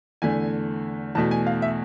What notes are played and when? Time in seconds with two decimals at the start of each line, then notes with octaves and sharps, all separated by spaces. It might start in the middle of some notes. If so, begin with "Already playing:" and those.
0.22 E2 D3 A3 G#5
1.15 E2 B2 A3 A5
1.31 G#5
1.47 F5
1.62 E5